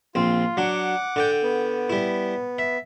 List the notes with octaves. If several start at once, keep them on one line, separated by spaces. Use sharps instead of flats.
A#1 C4 F4
F#3 D4 F#5 D6
D3 D5 G5
B3
G3 E4
E5